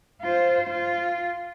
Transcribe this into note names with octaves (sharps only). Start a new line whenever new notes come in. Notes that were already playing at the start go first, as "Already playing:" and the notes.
F4 C5
F4